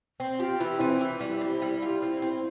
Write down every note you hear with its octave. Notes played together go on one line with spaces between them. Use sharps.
C4
F4 G4
E3 E4
E3 C4
E3 E4
G3
C4
G3
F4
C4
C4